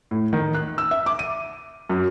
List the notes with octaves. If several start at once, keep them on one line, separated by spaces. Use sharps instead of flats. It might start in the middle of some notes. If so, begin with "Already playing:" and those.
A2
D#3
F#6
E6
E5
D6
D#7
F#2